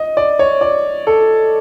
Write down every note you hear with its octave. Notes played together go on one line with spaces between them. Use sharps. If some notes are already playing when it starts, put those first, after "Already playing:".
Already playing: D#5
D5
C#5
D5
A4